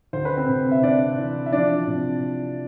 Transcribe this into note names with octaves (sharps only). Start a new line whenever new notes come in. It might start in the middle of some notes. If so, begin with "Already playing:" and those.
D2 C5
B4
C4 C5
C3
E5
C3 D4 D5
E3
E5
F3 D4 D5
C3